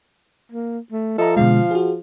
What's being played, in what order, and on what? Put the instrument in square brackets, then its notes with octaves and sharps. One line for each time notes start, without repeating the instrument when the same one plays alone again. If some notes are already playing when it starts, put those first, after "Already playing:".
[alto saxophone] A#3
A3
[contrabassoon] F3 [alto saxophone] A4 [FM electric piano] D#5 E5 A#5
[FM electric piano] B2 D3 G#3 [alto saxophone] F5
[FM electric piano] F#4 G#4